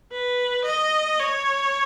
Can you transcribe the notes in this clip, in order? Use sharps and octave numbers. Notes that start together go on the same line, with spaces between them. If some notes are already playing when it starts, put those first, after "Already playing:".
B4
D#5
C#5